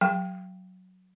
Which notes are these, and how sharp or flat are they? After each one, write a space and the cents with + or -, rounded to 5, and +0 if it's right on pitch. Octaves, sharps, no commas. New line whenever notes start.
F#3 +0 G5 +0